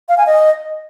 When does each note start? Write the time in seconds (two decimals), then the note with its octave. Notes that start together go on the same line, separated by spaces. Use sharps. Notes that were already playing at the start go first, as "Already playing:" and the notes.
0.09 F5
0.18 G#5
0.26 D#5